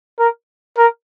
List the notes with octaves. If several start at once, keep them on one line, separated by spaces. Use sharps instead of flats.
A#4
A#4